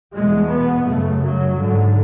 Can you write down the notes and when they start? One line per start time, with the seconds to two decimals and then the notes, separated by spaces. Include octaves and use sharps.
0.15 E2 B2 G#3
0.51 B3
0.87 F#2 C#3 A3
1.23 F#3
1.58 G#2 D3